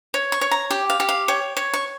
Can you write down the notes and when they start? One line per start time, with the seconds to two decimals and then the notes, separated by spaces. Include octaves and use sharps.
0.14 C#5
0.32 C#6
0.41 C#5
0.51 A#5
0.71 G4 G5
0.90 F5
1.00 G4
1.09 F5
1.28 C#5 G5
1.57 C#5
1.74 C#6